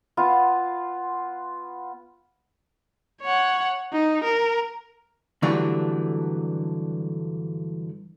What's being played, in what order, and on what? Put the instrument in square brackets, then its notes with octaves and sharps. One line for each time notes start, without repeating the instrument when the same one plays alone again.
[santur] B3 F4
[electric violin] C#5 F#5
D#4
A#4
[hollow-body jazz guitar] G2 D3 E3 F#3 A3 D4